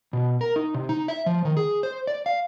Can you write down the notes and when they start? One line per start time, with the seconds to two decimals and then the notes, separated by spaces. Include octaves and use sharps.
0.13 B2
0.41 A#4
0.56 D#4
0.74 C3
0.89 D#4
1.08 E5
1.26 F3
1.45 D#3
1.57 G#4
1.83 C5
2.07 D5
2.26 F5